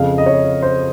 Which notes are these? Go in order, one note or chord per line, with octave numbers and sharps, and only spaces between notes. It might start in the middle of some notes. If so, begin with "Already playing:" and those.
Already playing: F2 C#3 F5
D#5
C#5
C5